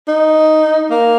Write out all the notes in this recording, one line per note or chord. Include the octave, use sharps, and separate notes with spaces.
D#4
A#3